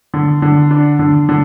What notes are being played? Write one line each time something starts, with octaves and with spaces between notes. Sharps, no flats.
D3
D3
D4
D3
D3